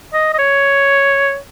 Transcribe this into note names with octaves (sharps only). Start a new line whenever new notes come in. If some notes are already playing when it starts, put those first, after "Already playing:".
D#5
D#5
C#5